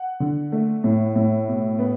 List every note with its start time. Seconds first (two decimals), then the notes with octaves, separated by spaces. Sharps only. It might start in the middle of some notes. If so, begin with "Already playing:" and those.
Already playing: F#5
0.20 D3
0.52 A3
0.84 A2
1.16 A2
1.48 B2
1.79 B3